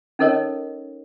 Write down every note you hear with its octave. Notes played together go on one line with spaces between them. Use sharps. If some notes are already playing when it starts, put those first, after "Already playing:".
C#4 D#4 A4 A#4 C#5 D#5